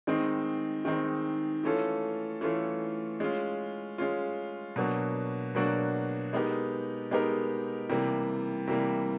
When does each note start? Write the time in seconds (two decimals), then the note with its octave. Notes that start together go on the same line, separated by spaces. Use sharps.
0.07 D#3 G#3 C4 D#4
0.85 D#3 G#3 C4 D#4
1.64 E3 A3 C#4 F4 A4
2.41 E3 A3 C#4 F4 A4
3.20 G#3 C#4 F4
3.98 G#3 C#4 F4
4.76 B2 F#3 A#3 D4 F#4
5.55 B2 F#3 A#3 D4 F#4
6.33 G#3 B3 D#4 G4 A#4
7.11 G#3 B3 D#4 G4 A#4
7.89 C3 E3 G3 A#3
8.68 C3 E3 G3 A#3